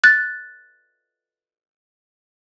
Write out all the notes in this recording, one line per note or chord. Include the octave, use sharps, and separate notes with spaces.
F#6 A6